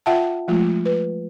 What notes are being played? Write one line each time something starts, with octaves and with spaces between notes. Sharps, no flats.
F4 E5 F#5 G5 A5
F3 G#3 A3 F4
B4